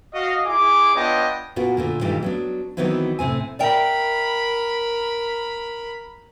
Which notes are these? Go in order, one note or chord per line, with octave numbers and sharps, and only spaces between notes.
F#4 D#5 F5
E4 G#4 G#5 D6
B3 D4 F4 C#5 D#5 G5
A#2 A#3 B3 F#4
A#2 D3 A#3
G2 A#2 D#3 E3 G3 G#3
F#3 B3 D4
D#3 E3 F#3 B3 C4 E4
A2 C3 C4 G#5
A#4 D5 E5 G5 B5